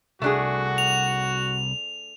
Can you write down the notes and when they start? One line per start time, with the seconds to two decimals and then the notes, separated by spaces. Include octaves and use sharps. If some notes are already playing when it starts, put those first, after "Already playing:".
0.22 C2 A3 D4 F#4 G#4
0.78 F7